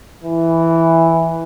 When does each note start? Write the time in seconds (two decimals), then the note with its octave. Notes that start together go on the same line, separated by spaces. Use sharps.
0.24 E3